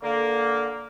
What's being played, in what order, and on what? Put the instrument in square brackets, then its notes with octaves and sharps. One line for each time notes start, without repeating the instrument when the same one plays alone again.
[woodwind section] D3 A#3